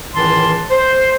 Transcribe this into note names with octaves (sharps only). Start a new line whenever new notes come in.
C#2 A2 D#3 E3 A5 C6
C5